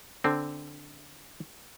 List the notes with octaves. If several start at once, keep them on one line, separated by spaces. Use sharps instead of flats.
D3 C4